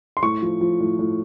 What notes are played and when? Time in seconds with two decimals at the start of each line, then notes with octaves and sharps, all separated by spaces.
0.17 C6
0.22 A2 C#6
0.42 F3
0.61 F3
0.80 A2
0.99 A2